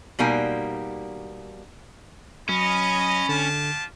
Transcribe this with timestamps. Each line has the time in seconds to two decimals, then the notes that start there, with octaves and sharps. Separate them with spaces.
0.19 B2 G3 A#3 D#4 G#5
2.49 F#3 C#4 D#5 B5
3.29 D3 F4 G4 A5